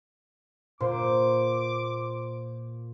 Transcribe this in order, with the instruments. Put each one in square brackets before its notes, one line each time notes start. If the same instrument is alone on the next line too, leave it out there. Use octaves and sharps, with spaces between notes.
[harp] A#2 [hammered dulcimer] C5 [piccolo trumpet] D6